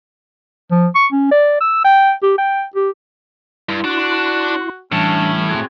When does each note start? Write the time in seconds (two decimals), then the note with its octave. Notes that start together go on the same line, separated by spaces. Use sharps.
0.71 F3
0.95 C#6
1.12 C#4
1.31 D5
1.61 E6
1.84 G5
2.23 G4
2.38 G5
2.75 G4
3.69 G2 E4 C6
3.84 D4 F#4
4.92 A2 E3 G3 C#4 D4 A5
5.49 C4 F#4 G#4